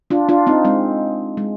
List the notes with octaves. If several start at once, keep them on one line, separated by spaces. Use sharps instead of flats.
D4 F4
D4 F4
C4 D#4
G#3 C4
G#3